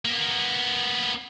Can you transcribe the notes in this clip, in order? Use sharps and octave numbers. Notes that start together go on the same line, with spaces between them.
A#3 B3